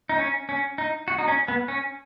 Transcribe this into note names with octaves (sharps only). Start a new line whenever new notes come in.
D#4
C#4
C#4
D#4
F#4
D#4
C#4
B3
C#4